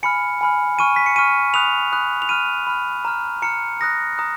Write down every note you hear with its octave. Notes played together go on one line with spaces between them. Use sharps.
G#5 B5 F6 C#7
G#5 B5 F6
G#5 C#6 F6 D#7
B6
C#7
G#5 C#6 F6 D#7
B5 D#6 F#6 F7
B5 D#6 F#6
F7
B5 F6 D#7
B5 F6
A#5 F6
A#5 F6 C#7
A#5 D#6 F#6 A#6
A#5 D#6 F#6